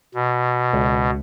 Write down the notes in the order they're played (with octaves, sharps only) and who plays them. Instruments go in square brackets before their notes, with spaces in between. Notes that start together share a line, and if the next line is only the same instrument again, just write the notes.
[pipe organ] B2
[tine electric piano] C#2